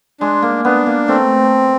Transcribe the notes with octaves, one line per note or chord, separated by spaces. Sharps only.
G#3 D4
A#3
B3 D4
A#3
A3 C4